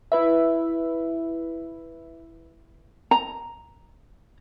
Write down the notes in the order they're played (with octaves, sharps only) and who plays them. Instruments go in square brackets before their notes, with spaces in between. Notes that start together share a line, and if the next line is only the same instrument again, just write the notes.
[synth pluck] E4 B4 E5
[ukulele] A#5